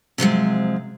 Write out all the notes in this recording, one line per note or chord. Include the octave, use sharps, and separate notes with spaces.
C3 F3 F#3 G#3